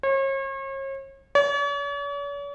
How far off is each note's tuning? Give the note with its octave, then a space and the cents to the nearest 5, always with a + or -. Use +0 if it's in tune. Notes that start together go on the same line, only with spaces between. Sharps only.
C#5 -40
C#5 +45